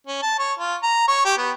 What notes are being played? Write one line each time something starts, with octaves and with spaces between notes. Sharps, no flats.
C#4
A5
C#5
F4
A#5
C#5
G4
B3